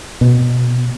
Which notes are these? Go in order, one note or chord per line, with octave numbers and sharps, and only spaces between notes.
B2